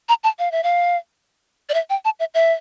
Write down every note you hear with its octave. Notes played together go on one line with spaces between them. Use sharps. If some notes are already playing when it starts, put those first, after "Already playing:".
A#5
A5
F5
E5
F5
D5
E5
G5
A5
E5
E5